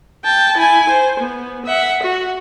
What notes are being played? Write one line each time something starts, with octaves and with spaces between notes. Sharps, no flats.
G5 A5
E4 G#5
C5
B3
E5 F#5
F#4